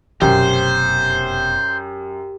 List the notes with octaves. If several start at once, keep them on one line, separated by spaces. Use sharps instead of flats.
F1 F#2 B2 G4 C5